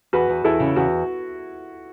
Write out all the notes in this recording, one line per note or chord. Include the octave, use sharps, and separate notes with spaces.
E2 F#4 B4
E2
E2 E4 A4
C#3
E2 F#4